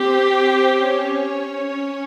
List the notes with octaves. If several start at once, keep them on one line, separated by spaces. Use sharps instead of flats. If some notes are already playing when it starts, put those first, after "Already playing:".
Already playing: C4 G4 C5
C4 C5
C#4 C#5